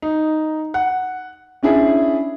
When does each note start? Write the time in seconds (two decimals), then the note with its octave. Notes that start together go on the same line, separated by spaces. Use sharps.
0.02 D#4
0.74 F#5
1.63 C#4 D4 E4 G#4